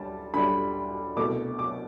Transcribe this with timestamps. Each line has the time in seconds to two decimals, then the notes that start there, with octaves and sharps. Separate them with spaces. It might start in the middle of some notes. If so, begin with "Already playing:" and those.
Already playing: D2 G3 A5
0.34 D2 D3 G3 B5
1.16 C2 B2 A3 D6
1.59 D6